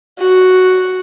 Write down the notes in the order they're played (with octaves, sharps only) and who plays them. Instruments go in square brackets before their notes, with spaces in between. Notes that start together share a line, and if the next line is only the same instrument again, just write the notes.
[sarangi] F#4